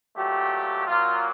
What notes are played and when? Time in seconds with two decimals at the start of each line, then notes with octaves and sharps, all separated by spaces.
0.15 A#2 F#3 A3 G4
0.87 A#2 F#3 A#3 F4